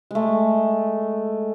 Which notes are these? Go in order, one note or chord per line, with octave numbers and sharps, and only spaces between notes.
G#3 A3